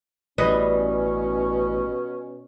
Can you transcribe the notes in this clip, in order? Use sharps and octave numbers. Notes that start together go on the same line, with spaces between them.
A1 B2 G3 C#4 B4 D#5